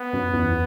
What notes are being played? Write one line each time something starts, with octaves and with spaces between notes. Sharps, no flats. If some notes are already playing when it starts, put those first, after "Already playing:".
Already playing: B3
F#2
E2